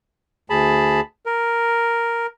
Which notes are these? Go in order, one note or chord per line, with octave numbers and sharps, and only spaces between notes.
D2 G#4 A5 B5
A#4